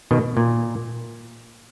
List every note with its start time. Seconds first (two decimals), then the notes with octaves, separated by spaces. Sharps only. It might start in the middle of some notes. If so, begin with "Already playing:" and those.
0.11 B2 D#3
0.37 A#2